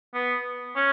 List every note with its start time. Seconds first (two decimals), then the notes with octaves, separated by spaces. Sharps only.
0.14 B3
0.76 C#4